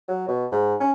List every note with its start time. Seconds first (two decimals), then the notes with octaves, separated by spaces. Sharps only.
0.08 F#3
0.28 B2
0.52 G#2
0.80 C#4